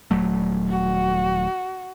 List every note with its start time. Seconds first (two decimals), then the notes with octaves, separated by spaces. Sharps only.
0.11 D#1 F#3 A3
0.68 F#4